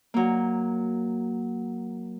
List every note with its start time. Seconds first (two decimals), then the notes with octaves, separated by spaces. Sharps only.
0.14 F#3 A#3